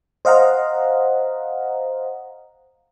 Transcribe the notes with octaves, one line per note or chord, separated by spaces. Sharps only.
C5 D#5 F5 F#5 A#5